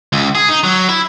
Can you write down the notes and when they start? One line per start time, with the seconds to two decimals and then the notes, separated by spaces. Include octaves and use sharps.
0.13 C#2
0.35 G#4
0.49 D#4
0.64 F#3
0.89 E4